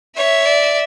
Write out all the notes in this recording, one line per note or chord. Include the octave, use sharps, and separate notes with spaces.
C#5 E5
D5